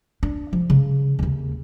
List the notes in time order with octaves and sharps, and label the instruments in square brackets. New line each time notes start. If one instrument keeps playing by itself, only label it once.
[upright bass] D4
F3
C#3
D#2 C#3